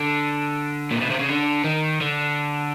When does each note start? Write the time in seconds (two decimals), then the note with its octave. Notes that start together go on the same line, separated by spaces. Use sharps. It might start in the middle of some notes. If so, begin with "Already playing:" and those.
Already playing: D3
0.91 A#2
1.01 B2
1.10 C3
1.19 C#3
1.29 D3
1.64 D#3
2.01 D3